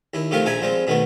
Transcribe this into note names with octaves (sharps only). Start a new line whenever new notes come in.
D#2 E4
C3 D#3 F3 A3 G4 F5
A#1 F3 A4 E5 G#5 A#5
F3 G3 G#3 C4
B2 D#3 A3 B3